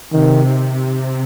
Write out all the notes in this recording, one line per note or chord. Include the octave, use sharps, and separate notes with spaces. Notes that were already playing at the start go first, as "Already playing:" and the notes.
C3 D#3
C3